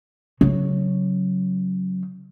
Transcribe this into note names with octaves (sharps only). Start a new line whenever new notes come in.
C#3 F#3